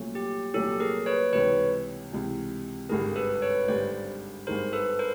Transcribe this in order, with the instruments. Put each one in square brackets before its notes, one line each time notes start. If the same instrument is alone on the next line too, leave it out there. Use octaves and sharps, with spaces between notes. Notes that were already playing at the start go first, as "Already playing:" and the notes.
Already playing: [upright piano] C2 A#2 F#3 A3 C#4
[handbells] G4
[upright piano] C2 A#2 F#3 A3 C#4 [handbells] G4 A4
[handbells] G#4 A#4
B4 C#5
[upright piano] C#2 C3 E3 [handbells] B4 C#5
[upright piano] C#2 C3 E3
[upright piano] G#1 G2 D3 G3 [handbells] G#4 A#4
[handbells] A4 B4
B4 C#5
[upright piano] G#1 G2 D3 G3 [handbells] C5 D5
[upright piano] G#1 G2 D#3 G#3 [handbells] A#4 C5
[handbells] A4 B4
A#4 C5